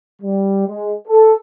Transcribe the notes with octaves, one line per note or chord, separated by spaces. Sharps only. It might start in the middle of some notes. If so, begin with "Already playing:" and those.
G3
G#3
A4